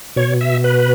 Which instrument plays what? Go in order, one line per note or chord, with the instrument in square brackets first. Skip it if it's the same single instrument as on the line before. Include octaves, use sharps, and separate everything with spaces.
[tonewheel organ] B2 C#5
E5
B4